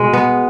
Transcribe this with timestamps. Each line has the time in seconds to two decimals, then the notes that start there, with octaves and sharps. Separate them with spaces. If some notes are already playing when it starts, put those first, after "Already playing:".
Already playing: B2 G#3
0.13 B3